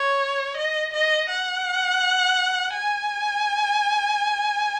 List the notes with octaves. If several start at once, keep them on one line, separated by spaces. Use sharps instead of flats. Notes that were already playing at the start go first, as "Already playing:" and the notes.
Already playing: C#5
D#5
D#5
F#5
G#5